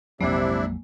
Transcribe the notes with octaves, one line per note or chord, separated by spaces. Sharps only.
A#1 F2 C3 F#3 G#3 A#3 D4 E4